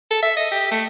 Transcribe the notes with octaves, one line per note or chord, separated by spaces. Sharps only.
A4
E5
D#5
G4
A3